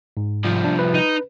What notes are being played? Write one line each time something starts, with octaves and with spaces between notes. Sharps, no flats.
G#2
C2 F3
D4
B4
D#4